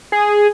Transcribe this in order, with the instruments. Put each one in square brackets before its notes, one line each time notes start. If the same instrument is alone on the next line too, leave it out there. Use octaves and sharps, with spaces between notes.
[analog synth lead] G#4